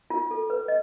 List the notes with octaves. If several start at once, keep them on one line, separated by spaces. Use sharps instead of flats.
F4
A4
B4
D#5